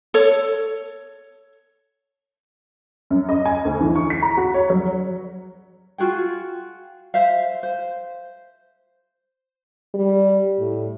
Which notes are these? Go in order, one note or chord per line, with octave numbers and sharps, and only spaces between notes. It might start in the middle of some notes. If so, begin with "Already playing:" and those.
A4 C#5
F#2
D#5
G#5
D2
E3
C#6
B6
A#5
F#4
C#5
F#3
F4 F#4 G#4 G5
C5 E5 F5
C5
G3
A2